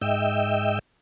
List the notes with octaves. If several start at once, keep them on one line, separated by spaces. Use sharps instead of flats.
G#2 D#5 E5 G5 E6